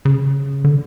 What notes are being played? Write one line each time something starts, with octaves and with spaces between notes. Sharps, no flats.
C#3
D3